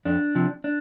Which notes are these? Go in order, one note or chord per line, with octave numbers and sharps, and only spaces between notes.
F2 D4
C3 F3
D4